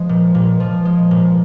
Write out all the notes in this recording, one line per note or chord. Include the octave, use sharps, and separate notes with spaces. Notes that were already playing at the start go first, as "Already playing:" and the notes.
Already playing: F3 G#3
A#2
A#2
F3
G#3
A#2